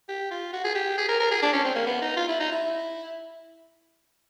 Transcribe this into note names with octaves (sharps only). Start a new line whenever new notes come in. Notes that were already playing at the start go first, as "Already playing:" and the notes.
G4
F4
F#4
G#4
G4
G#4
A#4
A#4
G#4
D4
C#4
C4
A#3
B3
D#4
F4
E4
D#4
E4